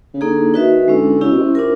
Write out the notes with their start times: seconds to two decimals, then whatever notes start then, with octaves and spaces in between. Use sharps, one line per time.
0.14 C#3
0.21 D3 A#3 D#4 G#4
0.54 D#3 D#4 F#4 B4 E5
0.88 D3 G#3 C#4 E4
1.21 C#3 C#4 E4 G4
1.31 B2
1.38 C3
1.55 D4 F4 A#4